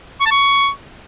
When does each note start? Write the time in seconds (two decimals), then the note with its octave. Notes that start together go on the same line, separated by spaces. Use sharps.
0.20 C#6
0.26 A5
0.31 C#6